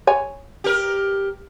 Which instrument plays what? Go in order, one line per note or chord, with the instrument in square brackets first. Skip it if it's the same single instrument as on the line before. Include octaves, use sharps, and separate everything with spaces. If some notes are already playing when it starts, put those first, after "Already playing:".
[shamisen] C#5 G#5
[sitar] G4 A#4